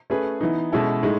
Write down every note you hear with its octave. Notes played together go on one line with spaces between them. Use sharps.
A3 C#4 G#4 B4
E3 B3 D#4
B2 G#3 C#4 E4 A4
A2 G#3 D#4